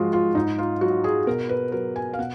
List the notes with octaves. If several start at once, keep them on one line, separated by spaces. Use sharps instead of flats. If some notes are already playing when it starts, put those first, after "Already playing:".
Already playing: G#2 F3 G#3 F4 F#4
F4
G#2 D#4
F4
F#3 F#4
G#4
B2 A#4
B4
F#3 A#4
G#5
F5
B2 F#5